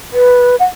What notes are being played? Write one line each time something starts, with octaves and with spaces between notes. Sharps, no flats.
B4
F#5